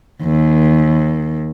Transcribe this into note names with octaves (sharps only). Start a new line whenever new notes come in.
D#2